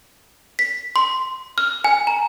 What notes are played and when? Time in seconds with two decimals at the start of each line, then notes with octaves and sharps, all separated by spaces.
0.59 B6
0.96 C6
1.58 F6
1.84 G#5
2.07 A#5